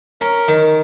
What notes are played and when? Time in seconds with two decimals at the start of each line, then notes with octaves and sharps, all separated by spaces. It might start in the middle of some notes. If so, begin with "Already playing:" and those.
0.21 C#4 A#4
0.48 D#3